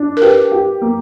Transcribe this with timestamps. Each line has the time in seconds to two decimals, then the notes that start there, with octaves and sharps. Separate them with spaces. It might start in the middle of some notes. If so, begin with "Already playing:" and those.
Already playing: D4
0.17 A#4
0.21 G4 B4
0.52 G4
0.81 A#3